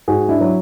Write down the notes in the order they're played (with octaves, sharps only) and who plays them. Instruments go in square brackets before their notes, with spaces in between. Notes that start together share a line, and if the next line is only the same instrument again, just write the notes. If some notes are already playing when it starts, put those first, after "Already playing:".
[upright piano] G#2 F#4 G#4
D4 E4
F#3